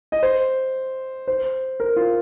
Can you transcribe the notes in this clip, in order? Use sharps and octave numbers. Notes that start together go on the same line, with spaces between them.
D#5
C5
C5
A#4
F4